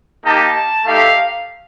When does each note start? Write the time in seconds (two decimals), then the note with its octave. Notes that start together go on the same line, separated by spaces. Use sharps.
0.24 A#3 D#4 G4 A5
0.85 A3 D#4 G4 F5